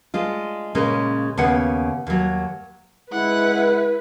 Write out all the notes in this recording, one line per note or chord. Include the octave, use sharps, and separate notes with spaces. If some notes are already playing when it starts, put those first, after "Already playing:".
G#3 D4 F4
A#2 C#3 G#3 C#4 A#4
D#2 C#3 B3 F#5
D#2 F#3
G#3 E4 B4 F#5